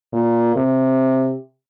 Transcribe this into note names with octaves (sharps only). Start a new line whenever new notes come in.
A#2
C3